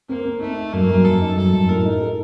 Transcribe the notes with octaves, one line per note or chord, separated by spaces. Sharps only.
A#3 C4
C4
A3 D#4
D#4
F#2 A#3
F#2
F#2 A4
D#4
F#2 A4
F#2
A2 A#4
D#4
A4